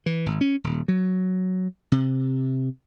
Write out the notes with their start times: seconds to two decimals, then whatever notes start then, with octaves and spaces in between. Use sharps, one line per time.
0.06 E3
0.26 G#1
0.41 C#4
0.64 D#1
0.88 F#3
1.92 C3